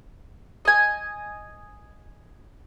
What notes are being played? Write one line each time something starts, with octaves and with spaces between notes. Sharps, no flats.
D#5 G#5